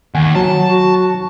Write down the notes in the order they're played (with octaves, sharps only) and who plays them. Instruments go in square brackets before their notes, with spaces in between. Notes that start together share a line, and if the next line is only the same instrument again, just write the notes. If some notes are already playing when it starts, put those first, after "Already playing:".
[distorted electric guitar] D#2 [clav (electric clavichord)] F#5 G#5
[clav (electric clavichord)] F#3 [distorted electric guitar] A5
[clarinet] F#4